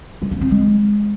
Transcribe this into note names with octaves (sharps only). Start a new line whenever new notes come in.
G#3
A#3
C4
G#3